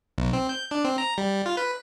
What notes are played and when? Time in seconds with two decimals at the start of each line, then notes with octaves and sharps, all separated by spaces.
0.18 B1
0.33 C4
0.49 G6
0.71 D4
0.85 C4
0.98 A#5
1.18 G3
1.46 F4
1.57 B4